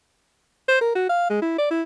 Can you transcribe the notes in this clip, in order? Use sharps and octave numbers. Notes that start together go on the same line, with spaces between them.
C5
A#4
F#4
F5
G#3
E4
D5
E4